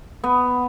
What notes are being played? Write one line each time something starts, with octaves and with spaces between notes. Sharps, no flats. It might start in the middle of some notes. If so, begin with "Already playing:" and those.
B3